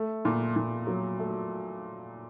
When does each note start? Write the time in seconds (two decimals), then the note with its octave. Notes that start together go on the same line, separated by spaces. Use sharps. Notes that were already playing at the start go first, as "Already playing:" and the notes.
Already playing: A3
0.25 A#2
0.56 A#2
0.87 F#3
1.19 A3